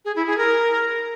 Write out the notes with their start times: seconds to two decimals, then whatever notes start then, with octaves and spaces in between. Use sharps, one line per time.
0.05 G#4
0.16 E4
0.27 G#4
0.38 A#4